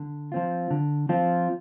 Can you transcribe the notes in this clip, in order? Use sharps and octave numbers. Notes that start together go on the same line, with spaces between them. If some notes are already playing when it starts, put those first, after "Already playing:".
Already playing: D3
F3 C4 F4
D3
F3 C4 F4